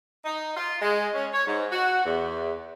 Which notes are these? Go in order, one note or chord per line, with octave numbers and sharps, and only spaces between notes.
D#4
F4
G#3
C#4
C#5
G#2
F#4
E2